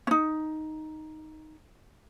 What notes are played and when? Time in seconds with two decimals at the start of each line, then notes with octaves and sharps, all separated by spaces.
0.07 C#4 D#4